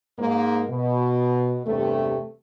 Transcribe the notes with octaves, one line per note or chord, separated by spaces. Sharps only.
G#2 A#3
B2
E2 G2 C3 A3